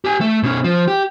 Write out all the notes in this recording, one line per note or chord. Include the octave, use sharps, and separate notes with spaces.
G4 G#5
A3
B2 C#4
F3
G4